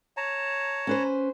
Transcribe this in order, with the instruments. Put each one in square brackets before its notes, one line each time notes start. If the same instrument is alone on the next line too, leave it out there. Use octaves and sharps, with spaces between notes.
[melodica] C#5 A5 A#5
[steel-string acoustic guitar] C#4 B4 C5